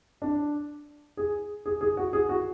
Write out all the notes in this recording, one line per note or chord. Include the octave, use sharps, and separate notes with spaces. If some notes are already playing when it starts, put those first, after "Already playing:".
D4
G#4
G#4
G#4
F#4
G#4
F#4